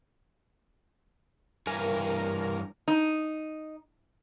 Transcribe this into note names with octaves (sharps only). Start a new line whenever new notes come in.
G2 E3 A#4 G#5
D#4